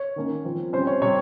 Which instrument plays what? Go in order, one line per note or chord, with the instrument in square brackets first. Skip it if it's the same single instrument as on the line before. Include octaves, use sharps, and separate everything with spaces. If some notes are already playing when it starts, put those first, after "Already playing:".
Already playing: [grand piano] C#5
D#3 A#3 C#4
F3 C4
C3 G3 C#4 C5
C#5
C3 G3 C4 C#5